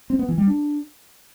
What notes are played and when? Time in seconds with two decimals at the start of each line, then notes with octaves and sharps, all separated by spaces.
0.10 C4
0.19 B3
0.29 E3
0.38 G3
0.47 D4